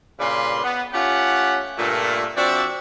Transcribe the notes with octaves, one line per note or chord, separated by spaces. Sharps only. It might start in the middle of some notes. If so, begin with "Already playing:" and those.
G2 A#2 C#3 D4 B4 C6
B3
A3 C#4 F4 G4 F#5
G2 A#2 A3
F3 C4 D4 F#4 D5 E5